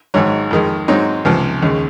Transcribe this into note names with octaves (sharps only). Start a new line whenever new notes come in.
G#1 G#2 F#3
F2 D#3 G#3
G#2 F#3 C4 D#4
C#2 C3 F3
D#2 C#3 G#3